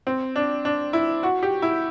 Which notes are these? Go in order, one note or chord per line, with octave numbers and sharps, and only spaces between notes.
C4
D4
D4
E4
F#4
G4
E4